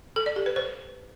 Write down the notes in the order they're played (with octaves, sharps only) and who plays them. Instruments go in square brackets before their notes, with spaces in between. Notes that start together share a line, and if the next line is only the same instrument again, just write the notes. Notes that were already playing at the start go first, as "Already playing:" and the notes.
[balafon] A4
D5
G4
B4
C5